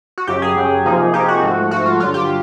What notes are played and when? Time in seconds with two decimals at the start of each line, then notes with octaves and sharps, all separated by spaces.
0.18 F#4
0.27 F#2 C#3 F#3 G4
0.42 G#4
0.56 F#2 C#3 F#3
0.86 C3 F3 A#3 D#4
1.13 C3 F3 A#3 D#4 G4
1.28 F#4
1.43 G#2 F3 A3
1.71 G#2 F3 A3 F#4
1.86 F4
2.00 G2 D3 F#3 F4
2.14 G4